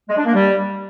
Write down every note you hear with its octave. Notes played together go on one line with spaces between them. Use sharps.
G#3
D4
A#3
G3